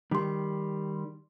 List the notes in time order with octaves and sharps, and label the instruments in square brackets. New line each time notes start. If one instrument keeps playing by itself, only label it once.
[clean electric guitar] D#3 G3 [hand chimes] G4 C6